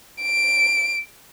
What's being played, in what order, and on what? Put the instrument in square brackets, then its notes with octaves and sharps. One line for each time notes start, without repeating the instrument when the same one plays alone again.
[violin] D7